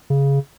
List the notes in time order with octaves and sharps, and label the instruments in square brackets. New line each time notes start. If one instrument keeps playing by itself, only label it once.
[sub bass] C#3